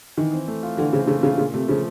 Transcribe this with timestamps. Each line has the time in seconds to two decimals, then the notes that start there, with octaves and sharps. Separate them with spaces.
0.17 D#3 E3
0.33 C4
0.48 A3
0.63 F4
0.77 D3 E3
0.93 C#3 C4
1.07 C#3 A3
1.23 C#3 F4
1.38 A#2 C#3
1.54 C3 A3
1.68 C#3 F3